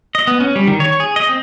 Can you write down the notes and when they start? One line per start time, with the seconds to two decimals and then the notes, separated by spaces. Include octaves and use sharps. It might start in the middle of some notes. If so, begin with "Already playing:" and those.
0.15 D#5
0.27 B3
0.40 C#4
0.56 G3
0.68 D#3
0.80 C#5
1.00 G#4
1.16 D#5
1.29 C4